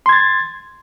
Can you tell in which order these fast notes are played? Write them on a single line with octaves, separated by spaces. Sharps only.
C6 G#6 A6